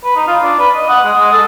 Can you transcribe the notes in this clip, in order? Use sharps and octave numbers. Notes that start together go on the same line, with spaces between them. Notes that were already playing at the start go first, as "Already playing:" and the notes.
B4
D#4
F4
D4
B4
D#5
F#5
G#3
G#3
A4